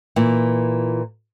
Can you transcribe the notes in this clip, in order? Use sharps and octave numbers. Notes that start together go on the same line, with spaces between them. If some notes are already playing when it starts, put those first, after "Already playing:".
A#2 E3